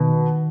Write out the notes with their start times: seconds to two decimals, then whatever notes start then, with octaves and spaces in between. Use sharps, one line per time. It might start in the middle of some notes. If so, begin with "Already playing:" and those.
Already playing: B2 D#3